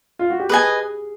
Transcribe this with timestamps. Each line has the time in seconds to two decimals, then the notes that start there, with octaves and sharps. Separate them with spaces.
0.19 F4
0.30 F#4
0.40 G4
0.49 G#4 B4 D#5 G#5